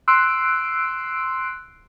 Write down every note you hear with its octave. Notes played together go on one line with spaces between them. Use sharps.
C6 E6 F#6 C7 D7